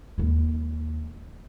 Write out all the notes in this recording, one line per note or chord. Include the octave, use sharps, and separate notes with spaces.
D#2 G#3